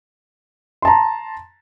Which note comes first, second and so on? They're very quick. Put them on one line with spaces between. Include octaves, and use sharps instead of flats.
C6 A5 A#5